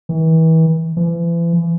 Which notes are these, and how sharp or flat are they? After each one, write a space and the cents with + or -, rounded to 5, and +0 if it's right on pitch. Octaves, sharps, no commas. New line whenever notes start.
E3 -35
E3 +40